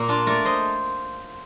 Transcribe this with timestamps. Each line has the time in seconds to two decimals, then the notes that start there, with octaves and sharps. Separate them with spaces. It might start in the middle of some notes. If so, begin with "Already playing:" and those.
Already playing: A#2 A#3
0.08 D4 F4
0.27 A3 A#4 D5
0.45 C5 D#5